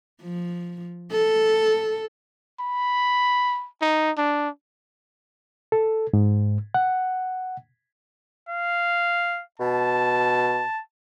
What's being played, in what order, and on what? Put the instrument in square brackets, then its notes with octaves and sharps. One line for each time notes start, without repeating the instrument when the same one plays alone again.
[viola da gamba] F3
A4
[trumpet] B5
D#4
D4
[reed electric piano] A4
G#2
F#5
[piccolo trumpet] F5
[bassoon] B2 [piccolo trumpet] A5